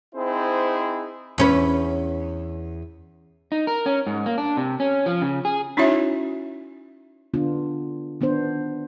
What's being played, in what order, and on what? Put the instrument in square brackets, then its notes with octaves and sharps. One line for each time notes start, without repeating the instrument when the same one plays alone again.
[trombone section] C4 D#4 E4 G#4 C5
[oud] E2 C#4 B4
[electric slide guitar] D#4
A#4
C#4
G#2
A#3
D4
C3
C#4
F3
C#3
G#4
[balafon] C#4 D#4 E4 F#4 C#5 E5
[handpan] D3 B3 D4 F4
D#3 B3 D4 C5